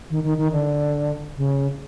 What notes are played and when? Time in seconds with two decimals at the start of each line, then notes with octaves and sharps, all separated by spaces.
0.10 D#3
0.24 D#3
0.38 D#3
0.52 D3
1.37 C#3